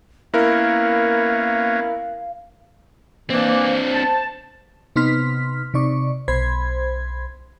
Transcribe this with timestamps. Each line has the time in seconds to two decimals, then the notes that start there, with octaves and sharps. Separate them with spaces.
0.34 A#3 B3 C#4 E4 A#4 F5
3.30 E3 A#3 C4 D4 C5
3.93 A5
4.96 C3 B3 D#4 C6 F6 B6
5.74 C3 D#4 D5 C#6
6.28 B1 C5 B5 C6 G#6